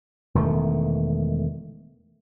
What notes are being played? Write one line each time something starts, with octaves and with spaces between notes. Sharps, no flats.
E1 D#3 A3